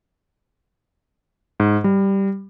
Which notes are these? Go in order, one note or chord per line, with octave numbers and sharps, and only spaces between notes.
G#2
G3